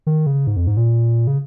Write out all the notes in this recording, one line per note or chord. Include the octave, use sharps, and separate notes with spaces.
D#3
C#3
G#2
F2
G#2
A#2
C#3